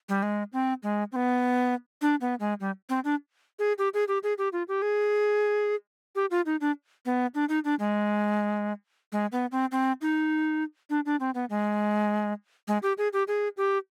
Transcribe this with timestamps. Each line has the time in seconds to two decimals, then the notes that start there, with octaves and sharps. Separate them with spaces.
0.09 G3
0.23 G#3
0.53 C4
0.83 G#3
1.12 C4
1.16 B3
2.02 D4
2.21 B3
2.40 G#3
2.60 G3
2.89 C4
3.05 D4
3.59 G#4
3.78 G4
3.94 G#4
4.08 G4
4.23 G#4
4.38 G4
4.53 F4
4.68 G4
4.82 G#4
6.15 G4
6.31 F4
6.46 D#4
6.61 D4
7.06 B3
7.35 D4
7.49 D#4
7.65 D4
7.79 G#3
9.12 G#3
9.32 B3
9.52 C4
9.72 C4
10.01 D#4
10.90 D4
11.06 D4
11.20 C4
11.35 B3
11.50 G#3
12.68 G#3
12.83 G4
12.98 G#4
13.13 G4
13.28 G#4
13.57 G4